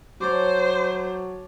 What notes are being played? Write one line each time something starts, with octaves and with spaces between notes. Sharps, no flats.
F#3 C5 C#5 A5 D6